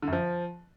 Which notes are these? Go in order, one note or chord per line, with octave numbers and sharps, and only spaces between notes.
D3
F#2
F3